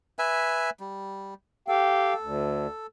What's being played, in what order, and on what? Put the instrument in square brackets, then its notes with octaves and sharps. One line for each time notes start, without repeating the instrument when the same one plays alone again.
[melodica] B4 E5 G#5
G3
[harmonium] G4 F5 G5 [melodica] A4
[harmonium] D2